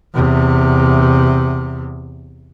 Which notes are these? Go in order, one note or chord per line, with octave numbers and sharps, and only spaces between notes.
E2 C3